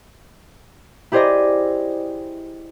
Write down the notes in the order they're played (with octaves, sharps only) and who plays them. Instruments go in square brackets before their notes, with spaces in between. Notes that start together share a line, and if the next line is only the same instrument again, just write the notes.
[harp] E4 G4 G#4 C5 D5 D#5